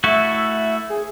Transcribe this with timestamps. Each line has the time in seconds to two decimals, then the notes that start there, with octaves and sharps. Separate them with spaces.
0.04 A3 E4 F#4 E5
0.90 G#4